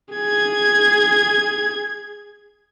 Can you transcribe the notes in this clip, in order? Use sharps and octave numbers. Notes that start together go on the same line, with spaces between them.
G#4 G#6